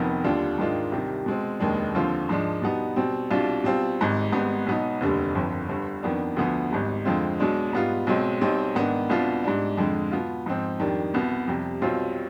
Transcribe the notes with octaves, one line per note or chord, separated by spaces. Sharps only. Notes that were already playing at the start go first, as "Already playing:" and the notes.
Already playing: F1 F2 D#3 B3
D#2 D3 G3 D4 F4
G#2 D#3 G#3 D4 F4
C2 C3 D#3 G3
B2 G#3 C4
F1 D#2 D#3 G#3 D4
D#2 D3 F3 C4 F4
G#2 F3 G#3 D4
B2 G3 B3 D#4
B2 G3 C4
C2 B2 G3 D4 F4
B2 G3 C4 F4
G#1 G#2 G3
G#1 G#2 G3 B3
B1 B2 B3 D#4
F1 D#2 D3 G3
G1 F2 D3
G1 G2 D3
F2 D#3 B3 D4
D2 D3 F3 B3
G#1 G#2 G3
F2 D3 G#3 C4 F4
B1 B2 G#3 D4
G#2 G3 B3 F4
B1 B2 G#3 C4
B1 B2 G3 C4 D#4
G#2 D#3 B3 D4
C2 B2 B3 D4 F4
G#2 G3 D4
F2 D3 G#3
B2 B3 F4
G#2 F3 C4
F2 D#3 G3 D4
C2 B2 B3
F2 C3 G3
B1 B2 G3 C4 F4